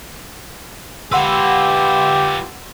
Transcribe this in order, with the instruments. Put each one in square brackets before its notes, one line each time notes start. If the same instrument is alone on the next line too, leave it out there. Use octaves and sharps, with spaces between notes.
[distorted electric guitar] F4 B4 [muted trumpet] G4 [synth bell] F#5 C6 E6